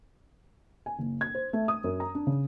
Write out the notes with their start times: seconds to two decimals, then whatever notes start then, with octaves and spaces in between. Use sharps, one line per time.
0.86 G#5
0.99 F#1
1.21 G#6
1.35 C5
1.53 A3
1.68 D#6
1.84 F#2
2.00 A#5
2.15 D4
2.27 C#3